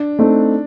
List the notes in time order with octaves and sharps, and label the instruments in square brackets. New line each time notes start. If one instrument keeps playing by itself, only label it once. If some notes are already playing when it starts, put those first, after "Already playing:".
Already playing: [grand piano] D4
[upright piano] A3 C4 D#4